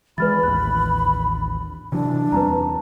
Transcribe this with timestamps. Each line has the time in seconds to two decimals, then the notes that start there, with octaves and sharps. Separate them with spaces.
0.18 E3 F#3 G#3 B4 B5 F6 A6
0.43 A1 D#2 F#6
1.92 C3 E3 F#3 D4
2.32 E2 G3 C4 B4 A5 A#5